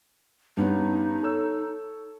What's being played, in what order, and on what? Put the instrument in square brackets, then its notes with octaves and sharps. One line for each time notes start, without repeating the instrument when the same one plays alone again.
[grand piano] G2 B3 C#4 [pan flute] D#4
[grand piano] A4 C#5 E6